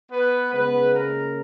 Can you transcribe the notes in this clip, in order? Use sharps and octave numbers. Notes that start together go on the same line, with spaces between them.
B3 B4
C#3 G#3 B3 B4
A#3 A#4